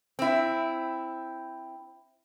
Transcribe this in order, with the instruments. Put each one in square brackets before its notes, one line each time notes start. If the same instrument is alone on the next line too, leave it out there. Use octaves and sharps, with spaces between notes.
[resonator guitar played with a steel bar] C4 E4